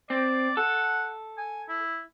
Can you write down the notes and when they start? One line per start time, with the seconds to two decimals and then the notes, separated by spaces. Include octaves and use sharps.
0.10 C4 D5
0.57 A4 F#5
1.38 G#5
1.69 E4